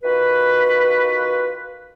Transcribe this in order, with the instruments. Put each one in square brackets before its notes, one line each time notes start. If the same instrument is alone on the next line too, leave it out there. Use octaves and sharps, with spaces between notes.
[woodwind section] D#3 F4 F#4 B4